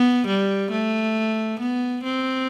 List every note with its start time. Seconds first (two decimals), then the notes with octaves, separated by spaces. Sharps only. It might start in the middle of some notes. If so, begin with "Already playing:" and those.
Already playing: B3
0.27 G3
0.71 A3
1.60 B3
2.04 C4